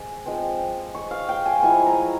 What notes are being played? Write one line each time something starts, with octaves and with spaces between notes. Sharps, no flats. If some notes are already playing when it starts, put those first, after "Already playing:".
Already playing: G#3 C4 G#5
F3 G#3 C4
C#6
F5
G5
G#5
F3 G#3 E4 C#6
A#5